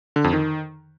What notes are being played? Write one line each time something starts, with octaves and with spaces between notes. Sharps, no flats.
D3
F2
D#3